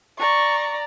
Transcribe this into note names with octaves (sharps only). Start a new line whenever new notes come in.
D5 A#5 C#6